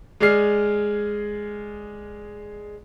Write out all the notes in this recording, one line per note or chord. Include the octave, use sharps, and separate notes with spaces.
G#3 G#4 D5 F6 C7